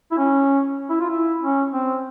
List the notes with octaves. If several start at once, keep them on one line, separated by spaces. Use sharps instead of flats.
E4
C#4
E4
F4
E4
C#4
C4